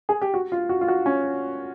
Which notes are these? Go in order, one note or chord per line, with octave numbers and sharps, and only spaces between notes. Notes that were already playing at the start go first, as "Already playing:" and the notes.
G#4
G4
F#4
F4
F#4
F4
F#4
C#4